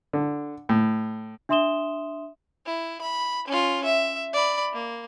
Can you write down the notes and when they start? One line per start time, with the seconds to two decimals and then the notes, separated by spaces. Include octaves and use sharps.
0.13 D3
0.69 A2
1.49 D4 E5 C6 D#6 E7 G7
2.66 E4
3.01 B5
3.48 C#4 F4
3.84 E5
4.33 D5 B5
4.74 A#3